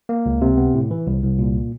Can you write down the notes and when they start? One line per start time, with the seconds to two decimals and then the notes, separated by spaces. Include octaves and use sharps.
0.09 A#3
0.26 C#2
0.41 C3
0.58 B3
0.74 A2
0.91 E3
1.07 C2
1.24 C2
1.39 A#2